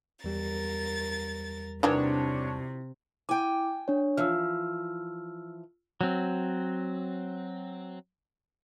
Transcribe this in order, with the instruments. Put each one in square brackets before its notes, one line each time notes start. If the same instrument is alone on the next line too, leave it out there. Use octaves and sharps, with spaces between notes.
[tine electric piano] E2 G3 G4 [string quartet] A#4 A6
[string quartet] C3 [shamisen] D#3 E3 F#3 [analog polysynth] D4 C#5
[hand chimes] E4 D6 [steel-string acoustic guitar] G5 G#5
[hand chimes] D4 C#5
[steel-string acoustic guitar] E3 F3 [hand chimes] E6 F6
[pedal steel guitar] F#3 C4